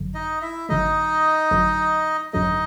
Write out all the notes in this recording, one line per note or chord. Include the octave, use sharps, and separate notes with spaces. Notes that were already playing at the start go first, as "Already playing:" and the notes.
Already playing: G#1 F#2 D3 F#3
D#4 D#5
E4 E5
G#1 F#2 D3 F#3 A3 D#4 D#5
G#1 F#2 D3 F#3 A3
G#1 F#2 D3 F#3 A3 D#4 D#5